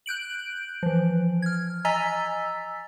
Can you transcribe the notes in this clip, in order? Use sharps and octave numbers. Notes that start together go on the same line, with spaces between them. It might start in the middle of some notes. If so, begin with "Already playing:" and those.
F#6 G6 D7 F#7
E3 F3
F6 G#6
D#5 G#5 A#5 E6 A6 B6